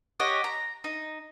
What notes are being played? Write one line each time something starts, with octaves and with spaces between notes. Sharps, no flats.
G4 C#5 D#5 F#5
A#5
D#4